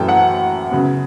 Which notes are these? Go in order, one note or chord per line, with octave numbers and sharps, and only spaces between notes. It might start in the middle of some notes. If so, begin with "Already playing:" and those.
Already playing: F#2 E3 A3 C#4 G5 A5
F#5
C#3 F#3 B3